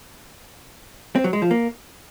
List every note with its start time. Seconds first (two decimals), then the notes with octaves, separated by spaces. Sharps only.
1.15 C4
1.24 F#3
1.33 G#3
1.42 F3
1.51 A#3